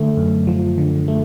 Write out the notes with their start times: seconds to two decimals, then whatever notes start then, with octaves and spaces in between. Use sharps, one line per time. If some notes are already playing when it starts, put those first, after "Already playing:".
Already playing: D3 A3
0.17 F#2
0.47 F3
0.78 D3
1.08 A3